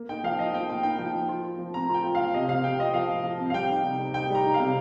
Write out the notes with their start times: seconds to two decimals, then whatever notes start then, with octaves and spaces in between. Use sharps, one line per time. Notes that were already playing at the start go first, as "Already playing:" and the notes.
Already playing: A#3
0.09 D#4 G5
0.24 F3 F5
0.39 F3 D#5
0.54 F3 G5
0.69 A#3 G5
0.83 D#4 G5
0.99 F3 G5
1.15 F3
1.29 F4
1.44 F4
1.59 F3
1.74 C4 A#5
1.89 F4 G5
2.04 F4
2.15 F5
2.19 F3
2.34 C3 D#5
2.49 C3 F5
2.64 C3 G5
2.79 F4 D#5
2.94 F3 F5
3.09 F3
3.24 F3
3.39 C4
3.50 F5
3.54 G3 G5
3.70 D#4
3.84 C3
3.99 C3
4.14 D#4 G5
4.30 G3 A#5
4.44 D#4
4.54 F5
4.60 C3